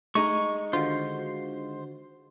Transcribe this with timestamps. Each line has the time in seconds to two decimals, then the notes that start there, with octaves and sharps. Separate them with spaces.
0.15 G#3 A3 D#4 C#6
0.73 D3 D#3 F4 F#4 C5